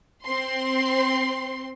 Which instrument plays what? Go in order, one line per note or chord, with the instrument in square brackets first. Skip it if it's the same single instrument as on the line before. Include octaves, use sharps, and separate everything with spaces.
[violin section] C4 C6